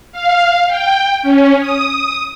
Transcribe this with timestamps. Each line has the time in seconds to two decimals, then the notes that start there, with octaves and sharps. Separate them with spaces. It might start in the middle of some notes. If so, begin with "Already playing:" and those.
0.12 F5
0.67 G5
1.22 C#4
1.60 D#6